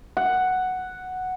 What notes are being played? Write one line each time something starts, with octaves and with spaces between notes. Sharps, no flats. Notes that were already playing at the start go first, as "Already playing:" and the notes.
F#5